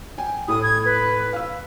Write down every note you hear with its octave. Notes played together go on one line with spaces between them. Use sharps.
G5 G#5
A2 E4 D#6
G#6
B4
F5 E6